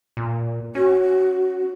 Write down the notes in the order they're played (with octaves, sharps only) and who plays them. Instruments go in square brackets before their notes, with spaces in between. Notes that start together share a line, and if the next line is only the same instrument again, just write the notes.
[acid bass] A#2
[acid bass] C#4 [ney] F#4